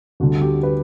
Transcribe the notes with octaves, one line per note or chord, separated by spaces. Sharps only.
D2 D3 G3 F#4
G4
B4